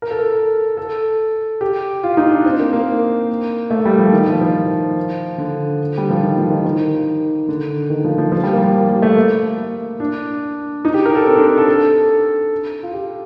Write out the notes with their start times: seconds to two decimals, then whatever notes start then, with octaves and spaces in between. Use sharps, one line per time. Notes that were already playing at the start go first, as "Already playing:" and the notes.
0.02 A#4
0.11 A4
0.19 A#4
0.77 A4
1.61 G4
2.03 F4
2.17 D#4
2.31 D4
2.46 C4
2.60 A#3
2.73 A#3
3.71 A3
3.86 G3
3.99 F3
4.13 D#3
4.28 F3
4.41 F3
5.38 D3
5.98 G3
6.10 F3
6.23 D#3
6.37 F3
6.51 D#3
6.64 D#3
7.48 D3
7.90 D#3
8.04 F3
8.18 F3
8.32 F3
8.44 G3
8.53 A#3
8.64 G3
8.89 G3
9.02 A3
9.17 A#3
10.00 D4
10.85 D#4
10.94 G4
11.05 A#4
11.15 A4
11.26 C4
11.36 D4
11.47 A4
11.57 A4
11.68 A4
12.83 F4
12.94 G4